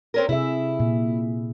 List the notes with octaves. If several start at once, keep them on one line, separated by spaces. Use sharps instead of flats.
C4 C#4 A#4
C3 E4 G#4 E5
A#2